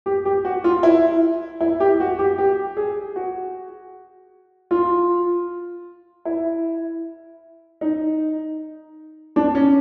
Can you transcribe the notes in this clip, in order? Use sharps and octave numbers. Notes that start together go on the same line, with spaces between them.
G4
G4
F#4
F4
E4
E4
G4
F#4
G4
G4
G#4
F#4
F4
E4
D#4
D4
C#4